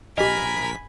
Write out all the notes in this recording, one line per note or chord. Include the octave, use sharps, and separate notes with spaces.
A#1 G4 A#4 D#5 G#5 B5 B6